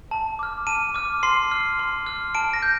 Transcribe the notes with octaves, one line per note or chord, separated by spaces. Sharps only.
A5
D6 F6
A5 D#7
D6 F6
C6 C7
F6
C6
F6
A5 D7
A#6
G6